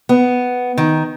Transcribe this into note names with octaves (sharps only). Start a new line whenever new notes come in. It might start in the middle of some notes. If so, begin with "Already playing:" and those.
B3
D#3